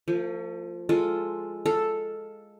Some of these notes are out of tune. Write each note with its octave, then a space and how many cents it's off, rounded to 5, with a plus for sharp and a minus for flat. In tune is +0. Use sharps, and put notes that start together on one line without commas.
F3 +0 A3 +45
G#3 +0 F4 +0 A4 +0
A4 +0 F5 +0